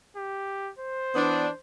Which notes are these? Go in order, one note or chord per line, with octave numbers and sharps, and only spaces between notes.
G4
C5
E3 B3 D4